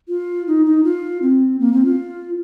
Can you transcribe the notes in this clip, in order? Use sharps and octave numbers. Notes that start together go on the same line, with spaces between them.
F4
D#4
D#4
F4
C4
A#3
C4
F4